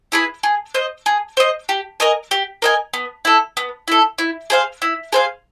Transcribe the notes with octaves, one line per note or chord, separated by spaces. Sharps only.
E4 G#4 B4
G#4
C5 D#5
G#4
C5 D#5
G4
A#4 D#5 G#5
G4
A#4 D#5 G#5
B3
E4 A4
B3
E4 A4
E4
G#4 C5 F5
E4
G#4 C5 F5